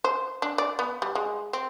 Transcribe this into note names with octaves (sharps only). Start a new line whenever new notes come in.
C5
D4
D5
B3
G3
G#3
C4